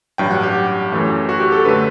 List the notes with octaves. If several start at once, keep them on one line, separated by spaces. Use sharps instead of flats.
A1 G2 F#3 G5
F#5
G4
F#2 E3 A3
F#4
G4
A4
F#2 D3 A3 B4